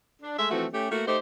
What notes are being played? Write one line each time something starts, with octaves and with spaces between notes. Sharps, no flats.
D4
G#3 A3 E5
E3 F3 A3 C4 F#4
A3 C#4 G4
A3 A#3 F#4
A3 D#4 G4 C5